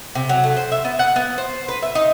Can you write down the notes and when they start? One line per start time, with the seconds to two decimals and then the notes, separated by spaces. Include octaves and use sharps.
0.15 C3
0.29 F#3
0.44 A3
0.56 C5
0.72 E5
0.85 B3
0.99 F#5
1.16 B3
1.38 C5
1.68 B4
1.82 E5
1.95 D#4